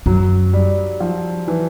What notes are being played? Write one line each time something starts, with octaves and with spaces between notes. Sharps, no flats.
F#2 F#3
G3
F3
E3